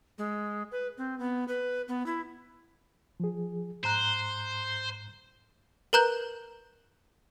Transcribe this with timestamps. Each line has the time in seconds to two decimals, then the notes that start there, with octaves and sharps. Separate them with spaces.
0.18 G#3
0.72 B4
0.98 C4
1.19 B3
1.48 B4
1.88 B3
2.06 E4
3.20 F3 G#4
3.84 G#2 C5 A#5 F#6
5.93 A#4 B4 A#5 F#6 G6